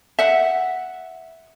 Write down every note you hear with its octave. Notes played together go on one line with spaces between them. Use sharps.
E5 F#5